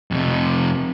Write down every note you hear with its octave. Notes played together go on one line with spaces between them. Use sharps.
F2 C3